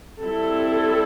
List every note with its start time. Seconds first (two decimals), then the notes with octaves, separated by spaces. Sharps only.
0.22 G3 C4 E4 A4